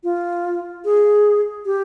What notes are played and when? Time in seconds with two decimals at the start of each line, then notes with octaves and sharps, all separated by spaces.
0.04 F4
0.85 G#4
1.66 G4